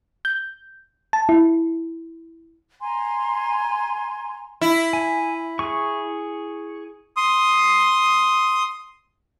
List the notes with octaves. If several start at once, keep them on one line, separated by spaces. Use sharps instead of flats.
G6
A5
E4
G#5 A#5 C6
E4
G#5
G#4 C#6
C6 D#6